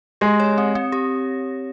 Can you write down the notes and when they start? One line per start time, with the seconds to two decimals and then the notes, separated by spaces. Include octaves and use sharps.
0.21 G#3 G4
0.40 C#5
0.58 C4
0.75 C4
0.92 G4